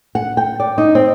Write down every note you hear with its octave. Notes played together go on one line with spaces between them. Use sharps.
F#5
G5
D5
D#4
C4